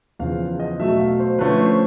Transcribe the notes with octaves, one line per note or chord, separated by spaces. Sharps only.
E2 C#3 F3 F5
D#5
B2 F#3 A3 E5
F5
C5
D3 F3 A3 C#4 B4
C5